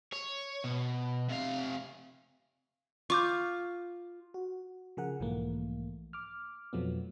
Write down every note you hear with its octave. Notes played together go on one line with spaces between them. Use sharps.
C#5
B2
C3 F5
F4 C#6 D6 G6
F#4
C#3 F3 G#4 A#4 F#5
B1 G#2 E3 F3 A3 A#3
D6 F6
F2 B2 F3 F#3 A3 B3